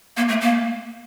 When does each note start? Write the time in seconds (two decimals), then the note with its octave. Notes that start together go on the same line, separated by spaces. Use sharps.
0.17 A#3
0.29 A3
0.41 A#3